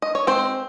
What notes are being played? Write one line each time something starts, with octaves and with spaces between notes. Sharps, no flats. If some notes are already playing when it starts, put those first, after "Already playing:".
D#5
C#5
G#3 C4 C5